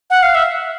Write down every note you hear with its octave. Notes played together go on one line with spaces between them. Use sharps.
F#5
F5
E5